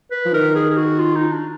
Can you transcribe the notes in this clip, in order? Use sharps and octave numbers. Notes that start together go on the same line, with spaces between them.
B4
F3
D#3 A#4
G#4
G#4
F#4
F4
D#4
D4